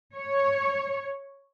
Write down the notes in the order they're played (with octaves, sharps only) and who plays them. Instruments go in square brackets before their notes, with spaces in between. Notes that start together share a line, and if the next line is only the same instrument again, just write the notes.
[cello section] C#5